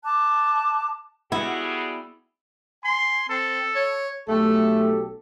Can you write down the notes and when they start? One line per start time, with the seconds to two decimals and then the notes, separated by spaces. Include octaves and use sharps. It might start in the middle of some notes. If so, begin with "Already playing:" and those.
0.05 A5 D6 F#6
1.32 G3 B3 E4 F#4 G#4
2.84 G#5 C6
3.29 C4 A4
3.75 C#5
4.29 B1 A3 G4 A4